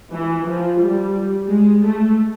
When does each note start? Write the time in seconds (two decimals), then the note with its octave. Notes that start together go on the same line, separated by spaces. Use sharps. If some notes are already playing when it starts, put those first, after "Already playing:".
0.13 E3
0.47 F3
0.80 G3
1.48 G#3
1.83 A3